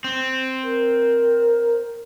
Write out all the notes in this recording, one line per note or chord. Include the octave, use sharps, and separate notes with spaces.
C4
A#4